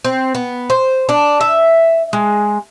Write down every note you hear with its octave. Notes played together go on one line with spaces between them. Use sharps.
C4
B3
C5
D4
E5
G#3